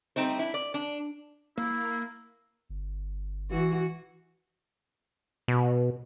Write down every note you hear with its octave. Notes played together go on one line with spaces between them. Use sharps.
G3 A3 C4 D#4 C5
D4 E4
D5
D4
A#3 E4
G1
E3 F#4
B2